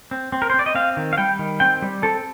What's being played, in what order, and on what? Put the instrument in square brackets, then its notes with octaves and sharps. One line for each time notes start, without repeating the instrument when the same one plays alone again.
[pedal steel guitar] C4
C4
A#4
C5
C4
D5
D#5
C4 F5
D#3
F5
G3 G5
D#3
C4 G5
G3
C4 A4